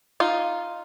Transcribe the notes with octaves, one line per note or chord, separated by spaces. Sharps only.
D#4 F4